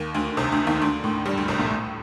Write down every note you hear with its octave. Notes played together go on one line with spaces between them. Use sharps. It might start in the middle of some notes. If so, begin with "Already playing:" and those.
Already playing: D#2 D#3
D2 D3
C2 C3
D2 D3
D#2 D#3
D2 D3
A2
G2 G3
D2 D3
C2 C3
A#1 A#2
A2